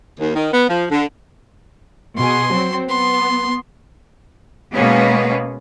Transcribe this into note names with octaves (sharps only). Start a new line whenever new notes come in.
D#2
D#3
B3
F3
D3
B2 G#4 C6
F#3 C4
B3 C6
B2 G#3 A#3 B3 C#4